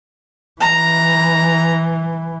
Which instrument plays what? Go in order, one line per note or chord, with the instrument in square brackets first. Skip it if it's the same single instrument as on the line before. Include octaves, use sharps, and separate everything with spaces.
[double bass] E3 [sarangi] A#5